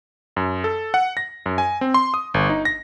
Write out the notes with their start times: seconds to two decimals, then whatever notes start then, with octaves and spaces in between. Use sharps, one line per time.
0.36 F#2
0.64 A4
0.94 F#5
1.17 A#6
1.46 F#2
1.58 G#5
1.81 C4
1.94 C6
2.14 D#6
2.34 G1
2.49 D#4
2.65 A#6